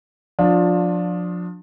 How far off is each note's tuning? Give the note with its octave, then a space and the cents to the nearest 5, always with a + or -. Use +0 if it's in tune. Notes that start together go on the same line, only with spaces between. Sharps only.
F3 +30 D4 +0 F4 +25